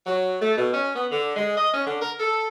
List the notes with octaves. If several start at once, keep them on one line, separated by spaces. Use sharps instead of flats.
F#3
A3
B2
C#4
B3
D3
G#3
D#5
C#4
D3
A#4
A4